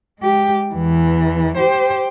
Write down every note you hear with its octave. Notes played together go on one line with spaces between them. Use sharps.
G#3 G4
E2 E3
G4 C5